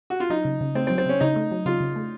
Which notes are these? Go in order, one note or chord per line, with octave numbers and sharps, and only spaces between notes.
F#4
F4
F#3 D#4
C#3
C#3
A3 C4
C4
F#3
C4
C#3 C#4
C#3 D#4
A3
F#3
C#3 F4
C#3
A3